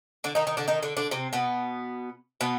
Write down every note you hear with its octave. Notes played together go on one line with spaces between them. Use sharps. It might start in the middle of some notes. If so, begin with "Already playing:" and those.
D3 D4
D#3 D#4
D#3 D#4
D3 D4
D#3 D#4
D3 D4
D3 D4
C3 C4
B2 B3
B2 B3